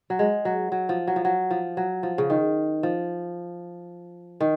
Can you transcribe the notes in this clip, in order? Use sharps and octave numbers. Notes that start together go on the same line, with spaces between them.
F#3
G#3
F#3
F#3
F3
F#3
F3
F#3
F3
F#3
F3
C#3
D#3
F3
D#3